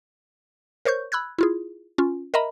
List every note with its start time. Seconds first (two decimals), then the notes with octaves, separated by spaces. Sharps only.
0.85 A#4 C5 C#5 C#6 G6
1.12 B5 E6 F#6 G#6
1.39 E4 F4 G#4
1.98 C#4 F4
2.34 A#4 D#5 E5 A#5 B5